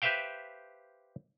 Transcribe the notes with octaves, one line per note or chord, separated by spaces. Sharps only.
G4 B4 C5 E5 F5 G5